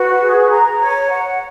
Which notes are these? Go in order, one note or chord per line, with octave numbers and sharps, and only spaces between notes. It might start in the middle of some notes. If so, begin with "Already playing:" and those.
Already playing: F#4 B4
G#4
A#5
C#5
F#5